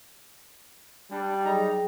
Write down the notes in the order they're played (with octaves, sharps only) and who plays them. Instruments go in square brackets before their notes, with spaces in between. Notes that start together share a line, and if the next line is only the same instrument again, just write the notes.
[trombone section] G3 [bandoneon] D4
[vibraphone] F#3 G#4 G5 [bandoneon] D#4 A#5